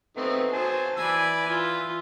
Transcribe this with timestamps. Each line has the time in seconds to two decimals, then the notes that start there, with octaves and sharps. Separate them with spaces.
0.17 A3 B3 C4 D#4
0.53 F#3 C5 G#5 A5
0.97 E3 B4 D5 G#5 E6
1.48 F4